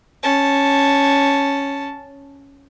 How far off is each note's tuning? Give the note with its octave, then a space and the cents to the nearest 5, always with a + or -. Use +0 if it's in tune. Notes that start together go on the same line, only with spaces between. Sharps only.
C#4 +0 A5 +0